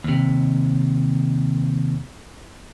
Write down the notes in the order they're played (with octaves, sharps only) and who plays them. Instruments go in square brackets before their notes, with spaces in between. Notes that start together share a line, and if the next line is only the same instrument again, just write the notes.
[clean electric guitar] D#2 C3